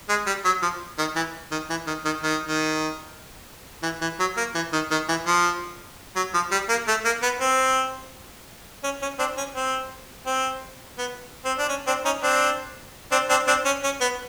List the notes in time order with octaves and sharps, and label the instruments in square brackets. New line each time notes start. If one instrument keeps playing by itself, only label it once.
[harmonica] G#3
G3
F#3
F3
D#3
E3
D#3
E3
D#3
D#3
D#3
D#3
E3
E3
F#3
A#3
E3
D#3
D#3
E3
F3
F#3
F3
G3
A#3
A3
A#3
B3
C4
C#4
C#4
C4 D4
C#4
C4
C4
B3
C4
D4
C#4
C4 D4
C#4 D#4
C4 D4
C4 D4
C4 D4
C4 D4
C#4
C#4
B3